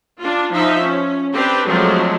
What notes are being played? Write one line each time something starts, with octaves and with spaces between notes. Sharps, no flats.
D4 F4
F3 D#4 E5
C#4
C4 D4 G4 B4
F3 F#3 G#3 A3 C4 D4